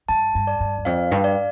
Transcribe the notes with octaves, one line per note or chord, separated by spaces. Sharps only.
G2 A5
G2
D5
G2
E2
F2 F5
G2
D5